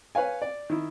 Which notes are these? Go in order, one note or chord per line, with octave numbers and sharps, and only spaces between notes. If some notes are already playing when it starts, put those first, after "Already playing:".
B4 C#5 F5 G#5
D5
D#3 E4